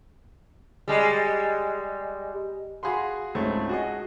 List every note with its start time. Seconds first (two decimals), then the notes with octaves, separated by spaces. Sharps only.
0.88 G3 G#3
2.83 F#4 G#4 F5 B5 C6
3.35 C#2 G#2 A3 C4 C#4
3.69 F#4 G#4 D#5